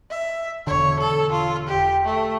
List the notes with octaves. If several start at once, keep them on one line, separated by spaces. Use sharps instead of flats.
E5
E1 D3 C#5
A4
F4
G4
A3